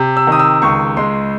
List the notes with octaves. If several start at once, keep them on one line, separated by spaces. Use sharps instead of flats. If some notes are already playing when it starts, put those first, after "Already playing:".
Already playing: C3
E6
D#3 D#6
E6
C#2 C#6
G#3 C6